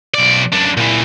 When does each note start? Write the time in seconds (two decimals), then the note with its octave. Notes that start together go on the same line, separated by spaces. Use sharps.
0.14 B1 D5
0.52 F#2 D4
0.77 A#2 E3